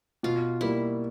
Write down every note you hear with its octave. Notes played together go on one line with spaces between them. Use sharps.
B2 F4
G3 A#3 E4